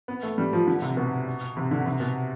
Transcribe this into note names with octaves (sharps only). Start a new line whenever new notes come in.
B3
A3
G3
F3
D3
C3
B2
C3
D3
C3
B2